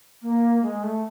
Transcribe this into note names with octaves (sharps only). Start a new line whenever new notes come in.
A#3
G#3
A3